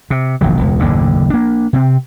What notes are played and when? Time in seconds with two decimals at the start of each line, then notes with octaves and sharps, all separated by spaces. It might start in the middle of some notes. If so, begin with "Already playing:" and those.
0.10 C3
0.41 E1 A#1 D#3 F#3
0.59 E1 C#2
0.80 F#1 D#2 A2 D3
1.30 A#3 D4
1.73 C3 C4